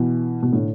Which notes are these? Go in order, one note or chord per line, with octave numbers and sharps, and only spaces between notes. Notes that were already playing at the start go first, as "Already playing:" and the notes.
Already playing: B2 E3
B2
A2 D3